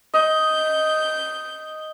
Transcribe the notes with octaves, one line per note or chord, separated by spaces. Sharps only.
D#5 G6